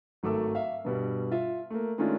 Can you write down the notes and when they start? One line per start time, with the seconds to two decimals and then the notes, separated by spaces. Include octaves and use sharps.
0.23 G#1 F#3 A3 A4 D6 E6
0.55 E5 F5
0.84 G2 B2 G3
1.31 F4 E5
1.70 A3 A#3
1.98 D#3 G#3 A3 C#4 D4 F4